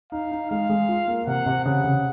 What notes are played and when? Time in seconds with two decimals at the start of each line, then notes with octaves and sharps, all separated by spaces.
0.12 D#4 F5
0.31 D#4
0.50 G#3 F5
0.70 G#3
0.89 F4
1.08 A#3
1.27 C3 F#5
1.46 C3
1.65 C#3 F#5
1.84 C#3